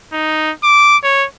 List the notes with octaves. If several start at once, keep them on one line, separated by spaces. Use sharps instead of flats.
D#4
D6
C#5